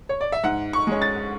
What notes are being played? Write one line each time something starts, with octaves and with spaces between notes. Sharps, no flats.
C#5
D5
E5
G#2 F#5
C#6
G#3 C#4
A6